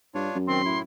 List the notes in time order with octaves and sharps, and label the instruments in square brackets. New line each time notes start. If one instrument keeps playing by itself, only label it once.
[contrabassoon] G2 [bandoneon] D4 F4 C#5
[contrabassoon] F#2
[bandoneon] D#3 C4 [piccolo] C6
[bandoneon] A2 E4